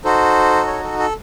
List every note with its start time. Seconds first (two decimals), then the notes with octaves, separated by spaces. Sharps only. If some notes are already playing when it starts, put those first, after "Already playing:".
0.04 D#4 F#4 A4 C5
0.67 C#5
0.84 A4
0.99 A4